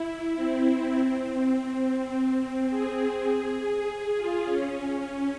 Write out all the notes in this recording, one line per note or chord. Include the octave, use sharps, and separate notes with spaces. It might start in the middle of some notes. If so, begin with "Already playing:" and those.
Already playing: E4
C4
G#4
G#4
F4
C#4